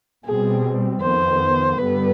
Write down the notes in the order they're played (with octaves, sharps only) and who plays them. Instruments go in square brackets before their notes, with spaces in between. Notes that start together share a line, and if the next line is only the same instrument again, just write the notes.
[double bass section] B2 G3 C4 [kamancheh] G#4
[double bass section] F2 D#3 B3 [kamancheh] C5
[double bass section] G2 D3 G3 B3 [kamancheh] B4